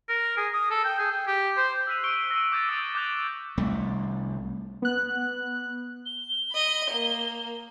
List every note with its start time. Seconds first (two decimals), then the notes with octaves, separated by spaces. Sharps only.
0.09 A#4
0.37 G#4
0.54 D#6
0.71 A4
0.84 G5
0.99 G#4
1.12 G5
1.27 G4
1.57 C5
1.87 E6 F#6 B6 C7 D#7 F7
2.04 C#6 E6 C#7 D7 G7
2.30 E6 A#6
2.52 D6 G6 A6 F7
2.69 D#6 E6 G6 A6 D7
2.95 D6 F#6 G6 F7 F#7
3.58 C2 A3
4.82 B3 F#6
6.06 G7
6.51 D#5 B5
6.90 A#3